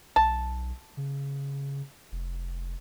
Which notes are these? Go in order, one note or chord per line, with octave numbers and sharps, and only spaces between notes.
B1 A5
C#3
F1